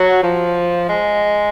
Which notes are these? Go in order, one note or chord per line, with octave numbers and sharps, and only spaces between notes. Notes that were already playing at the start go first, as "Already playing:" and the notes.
Already playing: F#3
F3
G#3